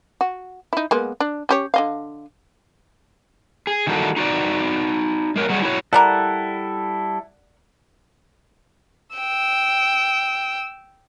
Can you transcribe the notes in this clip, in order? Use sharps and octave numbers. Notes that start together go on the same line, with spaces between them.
F#4
D#4 E4
G#3 A#3 B3
D4
C#4 G4 C#5
D3 D#5 F5
G#4
D#3 E3 G3 A#3 F#4 A4
D#4 F#4 B4 D5
G#3 A#4 C5 C#5
F#3 G3 B3 F#4 G#4
E4 F#4 C#5
G3 E4 A4 A#4 D5 F#5
G5 E6